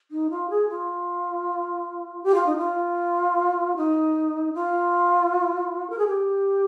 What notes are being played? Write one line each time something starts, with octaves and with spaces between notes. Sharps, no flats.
D#4
F4
G#4
F4
G4
F4
D#4
F4
D#4
F4
A#4
G#4
G4